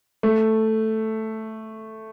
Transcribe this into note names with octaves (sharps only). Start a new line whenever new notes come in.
A3